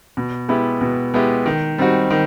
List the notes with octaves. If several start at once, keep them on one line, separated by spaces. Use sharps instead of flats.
B2
G#3 B3 E4 G4
B2
G#3 B3 E4 G4
D#3
G3 C4 D#4 F#4
D#3